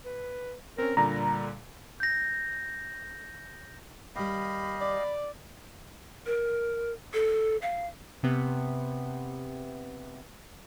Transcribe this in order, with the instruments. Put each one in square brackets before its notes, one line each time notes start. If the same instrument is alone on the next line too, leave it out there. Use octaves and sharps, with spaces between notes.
[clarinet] B4
[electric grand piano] C4 C#4 [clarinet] A#4
[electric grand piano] A#2 D3 [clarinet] G3 [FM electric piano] A#5
[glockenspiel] G6 A#6
[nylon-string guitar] D#2 G3 [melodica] G4 D#5 F5 [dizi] B5
[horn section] D5
[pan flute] A#4
A4
F5
[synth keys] C3 B3